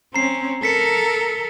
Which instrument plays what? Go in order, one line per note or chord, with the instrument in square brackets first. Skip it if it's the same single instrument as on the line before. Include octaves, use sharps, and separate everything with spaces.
[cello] C4 C#4 [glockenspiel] A#5 C7
[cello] A4 A#4 [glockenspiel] B6 C#7